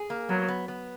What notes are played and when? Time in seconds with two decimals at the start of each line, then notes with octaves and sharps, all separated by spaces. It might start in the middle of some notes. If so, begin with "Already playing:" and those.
Already playing: G#4
0.10 A#3
0.29 F#3 B3
0.48 B3
0.68 B3